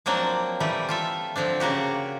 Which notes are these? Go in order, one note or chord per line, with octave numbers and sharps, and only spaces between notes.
F3 F#3 A#3 C4 D4
E3 G3 A3 G4
F4 A4 E5
D3 F3 C4 D4
C#3 A#3 F#4 G4